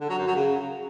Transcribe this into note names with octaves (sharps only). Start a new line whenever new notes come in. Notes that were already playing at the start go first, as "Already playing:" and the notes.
D3
F#3
F#2
F#3
C#3